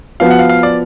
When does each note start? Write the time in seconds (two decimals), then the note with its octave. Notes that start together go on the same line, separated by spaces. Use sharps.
0.20 F3 B3 F#4 F5
0.30 F#5
0.39 F5
0.49 F5
0.63 D5